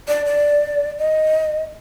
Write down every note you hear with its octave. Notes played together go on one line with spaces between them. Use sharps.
D5
D5
D#5